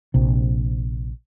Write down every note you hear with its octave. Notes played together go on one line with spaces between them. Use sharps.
A#1 C3